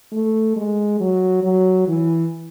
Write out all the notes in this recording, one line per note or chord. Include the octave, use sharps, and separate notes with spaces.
A3
G#3
F#3
F#3
E3